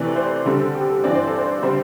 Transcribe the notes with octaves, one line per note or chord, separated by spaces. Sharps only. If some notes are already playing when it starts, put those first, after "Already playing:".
Already playing: C3 E3 A3 C4 D5
C5
D3 G3 C4 A4
A4
G4
A4
G2 E3 C4 D5
C5
A4
C5
D3 G3 C4 C5